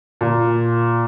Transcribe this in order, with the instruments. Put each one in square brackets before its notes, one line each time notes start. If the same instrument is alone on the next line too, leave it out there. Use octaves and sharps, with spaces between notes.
[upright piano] A#2